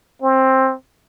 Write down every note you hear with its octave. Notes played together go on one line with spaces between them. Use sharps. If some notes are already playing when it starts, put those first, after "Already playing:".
C4